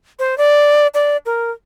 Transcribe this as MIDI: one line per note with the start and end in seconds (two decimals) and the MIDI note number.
0.19 0.37 72
0.38 0.87 74
0.94 1.17 74
1.26 1.51 70